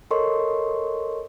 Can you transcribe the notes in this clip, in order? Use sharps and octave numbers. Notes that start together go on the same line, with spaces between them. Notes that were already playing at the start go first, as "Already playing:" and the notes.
A4 A#4 C#5 D#5 C6 C#6